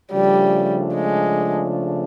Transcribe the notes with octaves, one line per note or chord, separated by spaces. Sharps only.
C#3 F3 G3 A3 D4
G#3